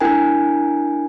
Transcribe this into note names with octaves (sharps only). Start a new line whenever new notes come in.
D4 E4 A#4 G5 G#5